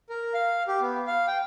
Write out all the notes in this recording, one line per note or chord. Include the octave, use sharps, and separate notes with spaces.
A#4
F5
G4
B3
F5
G5